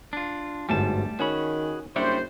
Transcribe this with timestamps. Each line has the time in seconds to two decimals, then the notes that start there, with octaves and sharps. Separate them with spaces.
0.13 D4 F4
0.69 G1 G#2 F#3 G3 A3 G#5 A5
1.20 D#3 C#4 F#4 G#4 C#5 B5
1.96 F#1 G3 D4 C5 C#5 E5